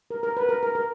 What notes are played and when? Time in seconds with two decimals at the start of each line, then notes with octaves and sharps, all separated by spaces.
0.10 A#4
0.23 A#4
0.37 B4
0.49 A#4
0.63 A#4
0.75 A#4